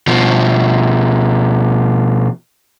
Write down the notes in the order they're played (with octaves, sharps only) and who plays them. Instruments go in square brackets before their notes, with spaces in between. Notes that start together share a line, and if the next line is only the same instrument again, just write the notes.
[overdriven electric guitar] B2 F3